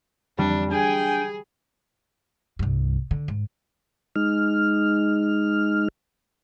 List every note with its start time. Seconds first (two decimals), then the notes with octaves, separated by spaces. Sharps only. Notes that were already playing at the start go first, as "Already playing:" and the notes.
0.39 F2 G3 D4
0.71 D4 G#4 G5 G#5
2.59 C2 G2
3.11 D3
3.28 G#2
4.16 G#3 D#4 F6